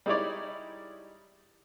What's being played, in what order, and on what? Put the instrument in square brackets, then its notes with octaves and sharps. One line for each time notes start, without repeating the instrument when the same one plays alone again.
[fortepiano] G3 G#3 D#4 E4 C#5 D5